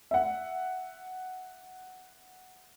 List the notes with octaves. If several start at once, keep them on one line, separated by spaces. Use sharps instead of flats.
E5 F#5